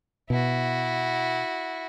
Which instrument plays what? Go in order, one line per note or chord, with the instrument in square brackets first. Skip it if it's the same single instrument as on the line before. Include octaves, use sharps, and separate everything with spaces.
[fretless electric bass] B2 [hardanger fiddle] E4 F#4